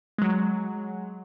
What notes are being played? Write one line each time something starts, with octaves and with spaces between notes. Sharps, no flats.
F#3 G#3